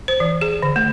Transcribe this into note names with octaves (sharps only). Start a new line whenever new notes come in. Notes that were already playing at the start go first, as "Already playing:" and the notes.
C5
E3
G#4
D3
A3